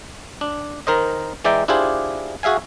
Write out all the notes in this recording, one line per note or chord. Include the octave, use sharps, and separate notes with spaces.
D4
D#3 A#4 C5 D#5
E3 G#3 D5 E5 G5 A#5
D4 E4 F4 G4 G#4 C5
F#4 G#4 E5 F5 G#5